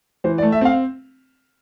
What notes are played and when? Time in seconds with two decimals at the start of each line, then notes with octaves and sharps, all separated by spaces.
0.24 E3 C5
0.38 D5
0.42 A3
0.52 E5
0.61 C4 F5